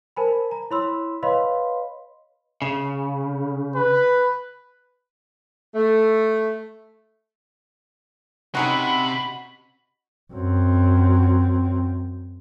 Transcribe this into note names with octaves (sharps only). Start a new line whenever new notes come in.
A#4 C5 G#5 A5 B5
A#5
E4 C#5 B5 C6 E6
B4 C#5 D#5 F5 B5 C6
C#3
B4
A3
C3 C#4 D#4 F#4 F#5 B5
F#2 C4